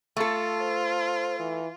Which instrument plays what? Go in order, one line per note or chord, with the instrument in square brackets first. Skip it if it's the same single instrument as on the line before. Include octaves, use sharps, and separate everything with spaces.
[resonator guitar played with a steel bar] A3 A4 [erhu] F4
[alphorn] C5
E3